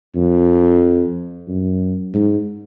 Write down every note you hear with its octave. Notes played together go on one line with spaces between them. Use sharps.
F2
F#2
G#2